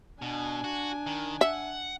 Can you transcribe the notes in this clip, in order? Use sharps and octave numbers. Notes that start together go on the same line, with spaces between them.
B2 D4 G#5
F#4
D#3
E5 F#5